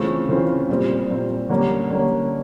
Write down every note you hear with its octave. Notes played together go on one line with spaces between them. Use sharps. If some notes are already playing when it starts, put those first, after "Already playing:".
Already playing: C#3 E3 A3 C4 F4
C#3 E3 A3 C4 F4
A#2 G3 C4
A#2 G3 C4
D3 G3 A#3 C#4
D3 G3 A#3 C#4